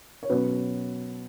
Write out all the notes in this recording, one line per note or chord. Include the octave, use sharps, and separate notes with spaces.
C#5
B2 F#3 C#4 B4